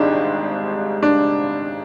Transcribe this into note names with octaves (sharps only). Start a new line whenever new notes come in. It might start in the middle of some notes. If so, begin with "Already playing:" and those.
Already playing: G#1 G#2 G3 D4 D#4
D4